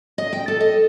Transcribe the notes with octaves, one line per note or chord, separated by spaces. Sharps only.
D#5
G5
A4
D#5